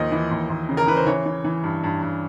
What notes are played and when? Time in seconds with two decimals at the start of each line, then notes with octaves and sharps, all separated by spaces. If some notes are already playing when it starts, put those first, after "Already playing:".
Already playing: D#2 F3 D#5
0.12 E3
0.31 D#2
0.50 D#2
0.69 C#3
0.77 A#4
0.87 E3 B4
0.97 C5
1.07 E3 C#5
1.26 E3
1.44 E3
1.63 G2
1.84 G2
2.02 G2